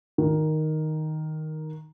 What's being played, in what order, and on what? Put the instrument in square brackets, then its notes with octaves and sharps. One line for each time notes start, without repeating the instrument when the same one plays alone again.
[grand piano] D#3